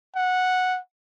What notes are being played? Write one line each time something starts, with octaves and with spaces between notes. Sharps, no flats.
F#5